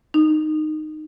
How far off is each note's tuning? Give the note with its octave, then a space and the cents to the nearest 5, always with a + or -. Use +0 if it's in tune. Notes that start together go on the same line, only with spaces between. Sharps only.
D#4 -15